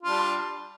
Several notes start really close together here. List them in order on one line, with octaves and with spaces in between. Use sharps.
F4 D4 G3